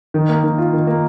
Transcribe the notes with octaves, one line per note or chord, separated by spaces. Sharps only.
D#3
A#3
D#3
F4
D#3
A#3